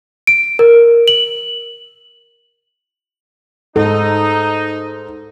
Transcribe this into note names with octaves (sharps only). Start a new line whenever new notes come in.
D7
A#4
F#7
G#2 D#4 A4